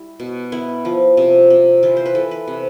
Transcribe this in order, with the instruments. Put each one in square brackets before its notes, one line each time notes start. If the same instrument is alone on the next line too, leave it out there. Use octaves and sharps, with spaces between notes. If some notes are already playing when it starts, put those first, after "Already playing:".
Already playing: [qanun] G3 E4
B2
B3 E4
F3
C3
C3
E3 F4
C5
B4
E3 A4
B4
C3